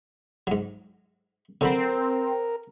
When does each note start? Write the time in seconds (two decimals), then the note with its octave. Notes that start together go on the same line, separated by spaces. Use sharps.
0.47 G#2 F#3
1.61 D3 F#3 C4 A#4 B5